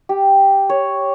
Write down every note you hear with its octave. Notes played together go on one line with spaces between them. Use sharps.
G4
C#5